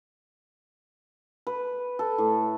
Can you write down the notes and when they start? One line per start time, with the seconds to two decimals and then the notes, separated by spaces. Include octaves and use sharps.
1.47 B4
1.99 A4
2.18 A2